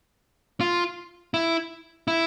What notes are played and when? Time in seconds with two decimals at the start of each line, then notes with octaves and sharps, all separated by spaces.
0.60 F4
1.34 E4
2.08 E4